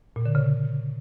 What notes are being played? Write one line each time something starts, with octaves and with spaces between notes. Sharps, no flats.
A#2
D3
C#3